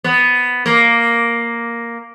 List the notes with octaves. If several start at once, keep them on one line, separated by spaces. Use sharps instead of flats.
B3
A#3